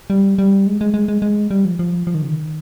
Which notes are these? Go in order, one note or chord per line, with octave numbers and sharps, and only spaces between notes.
G3
G3
G#3
G#3
G#3
G#3
G#3
G3
F3
F3
F3
D#3
C#3
D#3